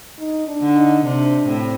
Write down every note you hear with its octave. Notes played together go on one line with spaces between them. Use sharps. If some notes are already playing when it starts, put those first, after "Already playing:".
D#4
D4
D3
D#4
C3 D4
A2 C4